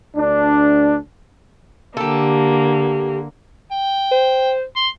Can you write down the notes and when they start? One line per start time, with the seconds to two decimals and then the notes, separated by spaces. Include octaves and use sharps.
0.16 D2 D4
1.97 D3 A#3 G4 A4
3.71 G5
4.12 C5
4.76 C6